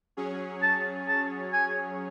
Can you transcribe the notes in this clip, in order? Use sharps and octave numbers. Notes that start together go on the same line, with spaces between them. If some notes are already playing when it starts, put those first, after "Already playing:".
F#3 C#4 G#4 C#5
A5
A5
G#5